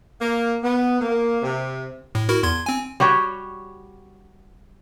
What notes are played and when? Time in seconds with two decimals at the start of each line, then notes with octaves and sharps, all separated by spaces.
0.21 A#3
0.64 B3
1.01 A#3
1.42 C3
2.15 A2
2.29 E4 F#4 A#4
2.43 E2 C6 G#6
2.66 C4 G#5
3.00 G3 F#4 G4 C#5